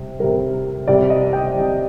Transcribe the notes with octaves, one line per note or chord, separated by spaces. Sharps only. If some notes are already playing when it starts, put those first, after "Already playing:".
Already playing: C3 G3
C3 G3 A#4
C3 G3 D5
D#5
G5
C3 G3